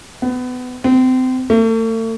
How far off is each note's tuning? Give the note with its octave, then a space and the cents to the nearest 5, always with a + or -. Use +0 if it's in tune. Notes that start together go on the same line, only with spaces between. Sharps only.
B3 +25
C4 -30
A3 +40